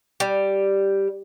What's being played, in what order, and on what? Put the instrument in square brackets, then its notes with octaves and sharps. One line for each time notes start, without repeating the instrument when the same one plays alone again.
[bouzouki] G3